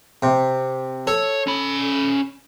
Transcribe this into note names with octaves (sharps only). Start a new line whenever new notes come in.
C3
A4 C#5
C#4 B5